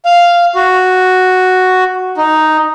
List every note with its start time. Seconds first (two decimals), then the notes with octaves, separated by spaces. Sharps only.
0.05 F5
0.55 F#4
2.17 D#4